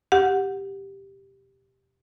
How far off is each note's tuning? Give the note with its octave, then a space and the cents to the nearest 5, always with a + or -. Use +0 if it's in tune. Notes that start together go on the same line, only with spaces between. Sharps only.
G4 +0 F#5 -15